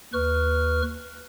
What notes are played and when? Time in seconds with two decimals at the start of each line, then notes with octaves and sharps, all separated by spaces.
0.13 D#2 B4 C#6 F6